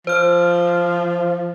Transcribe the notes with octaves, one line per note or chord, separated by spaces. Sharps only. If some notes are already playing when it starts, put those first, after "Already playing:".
F3 C5 F6